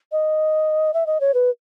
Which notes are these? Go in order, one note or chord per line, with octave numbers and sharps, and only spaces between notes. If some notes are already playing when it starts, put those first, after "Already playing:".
D#5
E5
D#5
C#5
B4